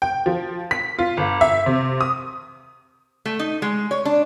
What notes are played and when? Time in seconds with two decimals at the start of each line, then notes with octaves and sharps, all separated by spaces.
0.02 G5
0.26 F3
0.71 B6
0.99 F4
1.17 G1
1.41 E5
1.66 C3
2.01 D#6
3.26 A3
3.39 D#4
3.62 G#3
3.91 C#5
4.05 D4